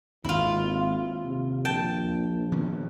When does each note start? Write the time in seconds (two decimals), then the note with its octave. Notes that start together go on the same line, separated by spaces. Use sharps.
0.24 G#1 D#2 C4 E4 F4
1.25 C3
1.65 A#1 G5 A5
2.52 D#3 B3 C#4